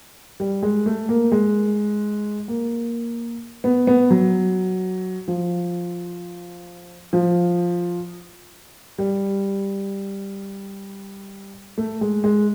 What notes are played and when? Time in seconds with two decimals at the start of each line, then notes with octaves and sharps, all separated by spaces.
0.40 G3
0.63 G#3
0.86 A3
1.09 A#3
1.32 G#3
2.48 A#3
3.64 B3
3.87 B3
4.11 F#3
5.28 F3
7.13 F3
8.98 G3
11.78 A3
12.01 G#3
12.24 G#3